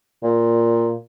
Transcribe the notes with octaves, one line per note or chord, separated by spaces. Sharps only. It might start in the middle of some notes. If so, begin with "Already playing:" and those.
A#2